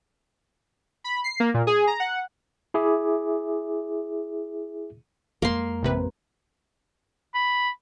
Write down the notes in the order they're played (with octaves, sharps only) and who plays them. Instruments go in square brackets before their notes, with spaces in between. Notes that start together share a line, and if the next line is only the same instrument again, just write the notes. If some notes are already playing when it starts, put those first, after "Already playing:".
[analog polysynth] B5
C7
A#3
A#2
G#4
A#5
F#5
[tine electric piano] E4 G#4 E5 D6
[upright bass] F2 G#3 [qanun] A#3 C6
[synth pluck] A1 C3 B4
[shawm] B5